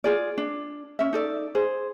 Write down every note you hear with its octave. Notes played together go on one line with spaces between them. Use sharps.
F4 G#4 D5
D4
C#4 E5
D#4 A4 D5
G#4 C5